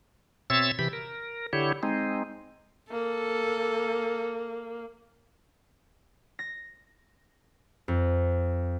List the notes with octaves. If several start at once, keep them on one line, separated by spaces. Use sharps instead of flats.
B2 C4 C#5 E5 E6 A6
C3 E3 G4 B5
A#4
D3 E4 G4 C#5
G#3 C4 D#4
A#3 A4
A#6
F2